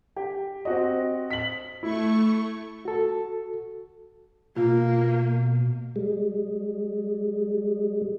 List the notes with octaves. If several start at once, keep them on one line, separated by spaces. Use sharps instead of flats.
G4
C4 F#4 D#5
B6 F#7
A3 E4 C#6
F#4 A4
B2 A#3 F4
G3 G#3